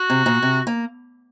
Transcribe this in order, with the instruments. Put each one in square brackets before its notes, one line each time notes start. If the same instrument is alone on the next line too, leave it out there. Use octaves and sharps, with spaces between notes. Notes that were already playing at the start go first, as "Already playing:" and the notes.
Already playing: [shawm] F#4
[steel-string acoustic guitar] C3
A#2
C3
A#3